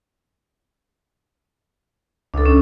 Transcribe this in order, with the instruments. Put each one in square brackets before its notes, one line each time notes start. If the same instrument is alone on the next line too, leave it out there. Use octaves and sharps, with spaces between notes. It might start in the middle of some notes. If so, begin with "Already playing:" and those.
[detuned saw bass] C#2 [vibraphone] D4 A4
[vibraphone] C#4